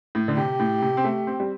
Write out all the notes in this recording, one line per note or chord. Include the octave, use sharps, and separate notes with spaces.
A2
D3
C3 G4
A2
C3
C4
A3
C4
G3